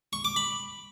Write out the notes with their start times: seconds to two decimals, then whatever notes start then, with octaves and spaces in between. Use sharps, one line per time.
0.13 C#6
0.25 D6
0.36 B5